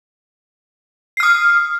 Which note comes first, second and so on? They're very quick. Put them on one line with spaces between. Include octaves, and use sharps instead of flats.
C7 F6 D#6